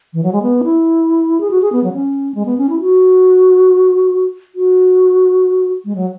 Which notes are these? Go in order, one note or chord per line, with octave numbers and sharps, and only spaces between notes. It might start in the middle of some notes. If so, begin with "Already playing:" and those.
E3
F#3
G#3
B3
E4
G#4
F#4
G#4
B3
F#3
C#4
G#3
B3
C#4
E4
F#4
F#4
G#3
F#3